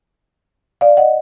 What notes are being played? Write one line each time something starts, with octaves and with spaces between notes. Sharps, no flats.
D5 F5
D#5 F#5